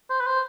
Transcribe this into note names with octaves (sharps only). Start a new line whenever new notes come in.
C5
B4
C5